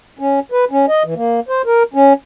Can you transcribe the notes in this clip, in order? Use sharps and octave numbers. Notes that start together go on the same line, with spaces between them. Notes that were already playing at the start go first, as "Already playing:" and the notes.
C#4
B4
C#4
D#5
E3
A#3
C5
A#4
C#4